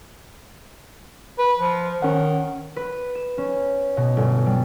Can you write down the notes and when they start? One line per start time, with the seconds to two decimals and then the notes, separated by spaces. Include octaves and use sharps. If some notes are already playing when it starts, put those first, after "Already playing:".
1.39 B4
1.59 F3
2.02 D#3 C#4 F#5
2.76 B4
3.15 E7
3.38 C#4
3.97 B2
4.17 G1
4.46 G3